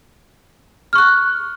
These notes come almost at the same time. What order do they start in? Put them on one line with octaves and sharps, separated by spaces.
F6 C#6 F#6